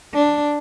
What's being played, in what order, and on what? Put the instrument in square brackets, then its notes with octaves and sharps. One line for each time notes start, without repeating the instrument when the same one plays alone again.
[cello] D4